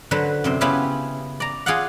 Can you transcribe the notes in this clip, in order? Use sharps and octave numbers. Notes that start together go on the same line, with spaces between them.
D3 F#3 B4 C5
F#2 C3 C5
C#3 B3 C#4 E4 F4 G4
D5 A#5
F4 G#4 D5 F5 F#5